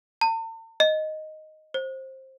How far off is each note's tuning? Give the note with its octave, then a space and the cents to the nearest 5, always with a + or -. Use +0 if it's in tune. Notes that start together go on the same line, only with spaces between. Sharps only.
A5 +45
D#5 +0
C5 +20